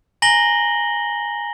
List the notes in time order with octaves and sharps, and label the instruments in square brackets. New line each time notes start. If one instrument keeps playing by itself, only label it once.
[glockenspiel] G#5 A#5 A#6 F#7 G7